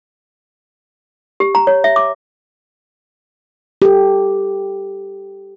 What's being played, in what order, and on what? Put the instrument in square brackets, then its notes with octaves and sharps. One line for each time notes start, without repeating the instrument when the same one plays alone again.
[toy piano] G4
A#5
C#5
E5
D6
[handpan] G4 A4